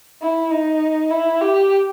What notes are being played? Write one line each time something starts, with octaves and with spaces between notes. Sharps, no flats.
E4
D#4
E4
G4